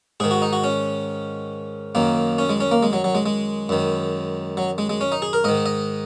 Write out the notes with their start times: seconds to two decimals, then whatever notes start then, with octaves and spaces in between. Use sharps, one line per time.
0.20 G#2 D#3 G#4
0.31 F#4
0.42 D#4
0.53 F#4
0.64 C#4
1.95 F#2 D#3 A#3
2.38 C#4
2.49 G#3
2.60 C#4
2.71 A#3
2.83 G#3
2.93 F#3
3.04 F#3
3.15 G#3
3.26 G#3
3.69 F#2 D#3
4.57 F#3
4.78 G#3
4.89 G#3
5.01 C#4
5.12 D#4
5.22 G#4
5.33 A#4
5.44 G#2 D#3 D#5
5.66 D#5